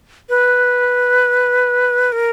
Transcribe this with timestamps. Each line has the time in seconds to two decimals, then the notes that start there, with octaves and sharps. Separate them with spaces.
0.29 B4
2.12 A#4